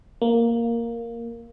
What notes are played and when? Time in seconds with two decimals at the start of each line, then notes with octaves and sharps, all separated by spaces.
0.22 A#3